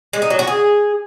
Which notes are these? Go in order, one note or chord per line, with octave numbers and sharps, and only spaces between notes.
G#3
D#4
F#3
F#4
G#4